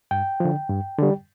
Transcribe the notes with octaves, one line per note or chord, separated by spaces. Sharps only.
G2 G5
D3 F3
G2
D3 G3